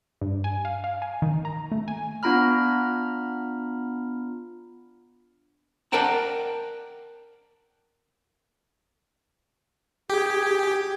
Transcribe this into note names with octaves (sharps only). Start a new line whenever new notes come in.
G2
G#5
F5
F5
G#5
D#3
A#5
A3
G#5
B3 D4 F4 A#5 B5 F6
A#4 D5 F#5 G5 A5 A#5
G4 G#4